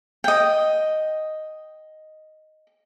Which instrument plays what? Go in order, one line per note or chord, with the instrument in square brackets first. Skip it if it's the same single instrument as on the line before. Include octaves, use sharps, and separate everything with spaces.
[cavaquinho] D#5 G5